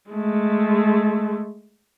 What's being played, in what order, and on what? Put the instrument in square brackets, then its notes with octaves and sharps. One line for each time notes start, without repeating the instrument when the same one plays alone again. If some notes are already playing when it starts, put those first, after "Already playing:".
[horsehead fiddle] G#3 A3